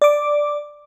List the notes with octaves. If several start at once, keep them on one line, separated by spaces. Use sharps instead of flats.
D5 D6